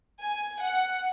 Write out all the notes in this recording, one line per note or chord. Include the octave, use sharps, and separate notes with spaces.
G#5
F#5